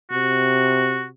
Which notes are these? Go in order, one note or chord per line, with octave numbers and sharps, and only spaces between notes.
C3 F#4